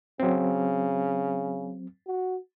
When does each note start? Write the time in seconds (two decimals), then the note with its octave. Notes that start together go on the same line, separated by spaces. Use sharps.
0.20 C#3 F#3 C4
2.07 F#4